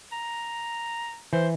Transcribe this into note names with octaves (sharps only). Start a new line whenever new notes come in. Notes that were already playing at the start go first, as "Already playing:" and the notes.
A#5
E3 C5